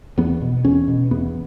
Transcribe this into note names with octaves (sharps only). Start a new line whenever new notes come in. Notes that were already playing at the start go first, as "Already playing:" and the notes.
E2 B3
B2
E2 C#4
B2
E2 B3